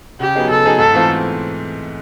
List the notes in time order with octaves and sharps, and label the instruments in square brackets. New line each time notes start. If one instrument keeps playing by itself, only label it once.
[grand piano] C#3 [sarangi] G4
[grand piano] F#3 B3 D#4 G#4
[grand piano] C#3 [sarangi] A4
[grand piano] F#3 B3 D#4 G#4
[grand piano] G#2 [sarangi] A4
[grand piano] E3 A3 C4 F4